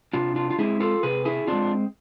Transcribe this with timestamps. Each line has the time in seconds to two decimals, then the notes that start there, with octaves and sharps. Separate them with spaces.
0.13 C3 D4 F4
0.36 D4 F4
0.51 F4
0.58 G#3 C4 E4 G#4
0.80 F4 A4
1.03 C3 G#4 B4
1.25 E4 G#4
1.47 G#3 C4 D4 F4